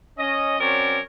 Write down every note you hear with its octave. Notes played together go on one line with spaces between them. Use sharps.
C#4 D#5
F#3 C4 C#4 A#4 C#5 D5